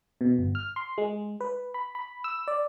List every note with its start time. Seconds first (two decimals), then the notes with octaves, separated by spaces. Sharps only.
0.21 B2
0.39 G1
0.55 F6
0.76 C6
0.98 G#3
1.40 B4
1.74 B5
1.95 B5
2.24 E6
2.48 D5